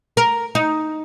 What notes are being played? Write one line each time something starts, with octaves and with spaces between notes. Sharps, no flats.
A#4
D#4